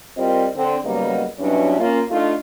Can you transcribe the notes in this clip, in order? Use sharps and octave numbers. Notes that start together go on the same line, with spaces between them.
G3 C4 F4 A#4 C5 D#5
D3 C4
C#3 F#3 G3 A#3 B3 D#4
G2 B2 F#3 C#4 D4 E4
A#3 C#4 F4
A3 D4 D#4 F4